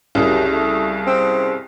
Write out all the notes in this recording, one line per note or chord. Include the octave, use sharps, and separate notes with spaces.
C2 F#2 C#3 G3
A3
C4